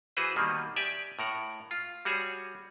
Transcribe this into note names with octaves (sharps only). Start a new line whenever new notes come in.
E3 F#4 G#4 B4 C5
B2 D#3 G3 A#3
G4 D5 E5 G#5
A2 A#4 F#5
F4
G3 F#4 G#4 C#5